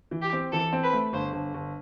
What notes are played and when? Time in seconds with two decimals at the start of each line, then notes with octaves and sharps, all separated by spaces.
0.11 E3
0.22 G4
0.33 C4
0.52 E3 A4
0.73 C4
0.83 B4
0.93 A3
1.13 G1 C5
1.33 G1
1.54 G1